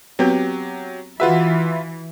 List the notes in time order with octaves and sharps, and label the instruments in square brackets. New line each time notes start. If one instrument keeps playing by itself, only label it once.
[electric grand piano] F#3 G4 [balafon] B3 C4 B4
[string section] E3 [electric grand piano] F4 B4 E5 [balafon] F#4 G#4 F#5